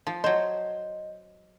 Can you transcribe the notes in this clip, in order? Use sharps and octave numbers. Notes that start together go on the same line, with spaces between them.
F3
F#3 C5 D#5